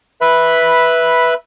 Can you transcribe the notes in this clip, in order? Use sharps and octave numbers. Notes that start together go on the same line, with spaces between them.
B4 E5 B5